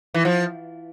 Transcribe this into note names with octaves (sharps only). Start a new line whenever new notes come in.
E3
F3